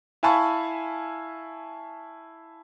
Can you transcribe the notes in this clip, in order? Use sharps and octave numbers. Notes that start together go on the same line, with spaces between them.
E4 F5 G#5 A5 B5 C#6